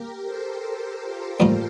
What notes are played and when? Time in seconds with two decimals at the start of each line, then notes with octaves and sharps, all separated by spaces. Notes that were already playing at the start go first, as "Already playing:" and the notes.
Already playing: A#3 G4 A#4
0.24 A4 C5
0.62 G4 A#4
1.01 F4 A4
1.40 A1 G2 F3 A#3